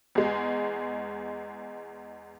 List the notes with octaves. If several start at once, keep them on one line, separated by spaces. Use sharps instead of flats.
E2 G#3